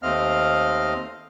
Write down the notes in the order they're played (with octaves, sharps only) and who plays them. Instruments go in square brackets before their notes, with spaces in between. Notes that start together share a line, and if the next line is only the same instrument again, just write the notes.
[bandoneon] D#2 A3 C4 D#5 F5 F6